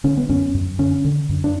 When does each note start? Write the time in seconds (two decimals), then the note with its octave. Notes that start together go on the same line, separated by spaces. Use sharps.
0.04 D3 C#4
0.17 B3
0.29 F#2 C#4
0.54 F#2
0.79 D3 C#4
1.05 D3
1.29 F#2
1.44 D4